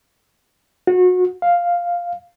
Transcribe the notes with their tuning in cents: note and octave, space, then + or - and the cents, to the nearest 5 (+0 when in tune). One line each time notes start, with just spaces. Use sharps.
F#4 -30
F5 +0